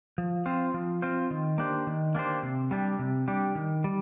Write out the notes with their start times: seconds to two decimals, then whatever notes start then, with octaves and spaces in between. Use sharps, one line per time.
0.18 F3
0.46 C4 F4 C5
0.74 F3
1.02 C4 F4 C5
1.31 D#3
1.58 A#3 D4 G4 C5
1.87 D#3
2.15 A#3 D4 G4 C5
2.43 C3
2.71 G3 D4 G4
2.99 C3
3.28 G3 D4 G4
3.55 D#3
3.84 G3